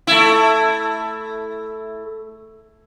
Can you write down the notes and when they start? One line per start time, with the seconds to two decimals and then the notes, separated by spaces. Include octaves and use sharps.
0.07 A3 E4